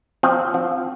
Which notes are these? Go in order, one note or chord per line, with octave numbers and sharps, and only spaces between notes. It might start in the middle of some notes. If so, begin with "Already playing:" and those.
F3 C4
F3